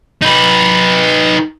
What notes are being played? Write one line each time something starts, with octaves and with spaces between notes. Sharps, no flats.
D#4 B4